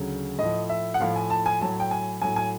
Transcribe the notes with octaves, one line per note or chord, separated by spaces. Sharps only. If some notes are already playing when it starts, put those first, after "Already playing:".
Already playing: D2 C#3 F#3
A2 F3 D#5
E5
F#5
A2 F3 F5
G#5
A5
G#5
A2 F#3 A5
G5
G#5
A2 F#3 G#5
G#5